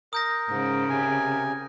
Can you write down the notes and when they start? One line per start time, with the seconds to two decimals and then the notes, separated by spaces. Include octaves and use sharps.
0.13 A#4 D#6 G6 A#6
0.49 G#2 C#3
0.89 C3 G#5